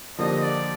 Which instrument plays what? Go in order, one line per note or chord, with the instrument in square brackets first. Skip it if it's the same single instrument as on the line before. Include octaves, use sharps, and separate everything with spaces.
[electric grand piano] D3 F3 A#3 D4 G4 [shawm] D#5
[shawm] D5